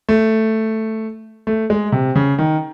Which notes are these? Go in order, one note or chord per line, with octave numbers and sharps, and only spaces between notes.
A3
A3
G#3
C3
C#3
D#3